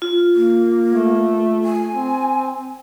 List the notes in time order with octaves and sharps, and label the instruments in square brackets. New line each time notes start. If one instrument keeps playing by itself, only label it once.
[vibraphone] F4
[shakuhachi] A#3
[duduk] A3
[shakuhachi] G#5
[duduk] C4